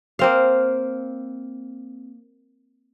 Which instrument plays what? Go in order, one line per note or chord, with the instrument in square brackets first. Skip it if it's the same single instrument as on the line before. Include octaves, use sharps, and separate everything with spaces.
[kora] A#3 C4 F5